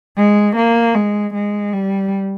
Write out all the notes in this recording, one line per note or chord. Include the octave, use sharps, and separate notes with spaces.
G#3
A#3
G#3
G#3
G3